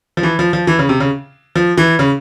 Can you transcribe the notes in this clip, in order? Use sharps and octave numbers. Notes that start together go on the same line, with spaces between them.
F3
E3
F3
F3
E3
C#3
C3
C#3
F3
E3
C#3